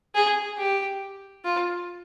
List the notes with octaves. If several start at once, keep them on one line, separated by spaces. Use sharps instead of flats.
G#4
G4
F4